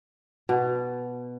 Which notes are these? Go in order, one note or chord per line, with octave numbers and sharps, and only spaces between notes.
B2